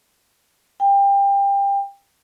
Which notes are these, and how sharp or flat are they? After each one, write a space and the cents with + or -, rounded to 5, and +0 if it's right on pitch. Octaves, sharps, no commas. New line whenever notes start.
G5 +25